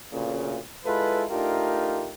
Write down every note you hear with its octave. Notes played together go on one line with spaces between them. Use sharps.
D2 A#2 C#3
G#3 E4 F4 A4 B4
A3 D4 D#4 F4 G4 A#4